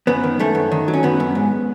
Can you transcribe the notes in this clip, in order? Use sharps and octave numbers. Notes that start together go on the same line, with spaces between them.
F#2 B3
D#3
F#2 A3
F#2
D#3
F#3
C#4
F#2 B3
F#2
G#2